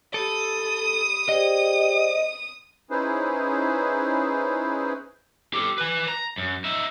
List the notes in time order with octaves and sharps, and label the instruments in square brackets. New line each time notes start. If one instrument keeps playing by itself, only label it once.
[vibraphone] G4 B5 [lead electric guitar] A4 [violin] D#6
[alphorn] G4 [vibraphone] G#4 C5 D5 [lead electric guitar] D#5
[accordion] C#4 D#4 E4 G#4 B4 C5
[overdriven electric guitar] G4 A4
B4 G#5
A#5
F#2
D#4 E5